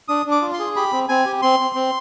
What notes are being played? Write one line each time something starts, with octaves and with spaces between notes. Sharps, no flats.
D4 D#6
D4
D6
F4
C6
G#4
G4 B5
C4
C4 G#5
G4
C4 C6
C4
C4